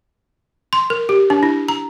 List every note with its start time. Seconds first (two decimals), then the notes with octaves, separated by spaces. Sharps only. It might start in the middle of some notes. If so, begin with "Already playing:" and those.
0.73 C6
0.90 A#4
1.09 G4
1.30 D4
1.43 E4
1.68 A#5